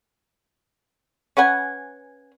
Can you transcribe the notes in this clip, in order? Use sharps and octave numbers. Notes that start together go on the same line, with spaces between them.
C#4 B4 F#5 G#5